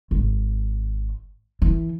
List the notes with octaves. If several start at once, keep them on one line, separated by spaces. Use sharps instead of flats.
G#1
E3